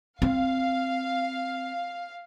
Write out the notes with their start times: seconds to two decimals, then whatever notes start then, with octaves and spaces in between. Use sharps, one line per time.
0.22 C4 F5